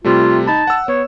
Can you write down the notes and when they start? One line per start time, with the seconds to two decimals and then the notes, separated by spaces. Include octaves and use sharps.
0.04 C3 G3 A3 F4
0.47 D#4 A5 B5
0.67 F#5 E6
0.88 B3 C#5